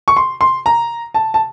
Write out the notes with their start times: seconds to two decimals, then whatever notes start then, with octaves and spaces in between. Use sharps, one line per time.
0.08 C#6
0.17 C6
0.41 C6
0.66 A#5
1.14 A5
1.34 A5